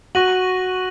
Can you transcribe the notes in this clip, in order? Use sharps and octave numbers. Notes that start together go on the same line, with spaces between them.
F#4 C#6 F#6 A#6 D#7 F#7